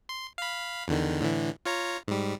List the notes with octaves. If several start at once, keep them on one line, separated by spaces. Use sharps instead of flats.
C6
F5 B5
E2 D3 D#3
A2 D3 E3
F4 C#5 A#5
G#2 G3